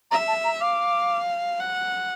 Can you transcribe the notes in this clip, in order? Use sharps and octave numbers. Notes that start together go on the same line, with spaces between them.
E5 A#5
A5
A#5
F5 D6
F#5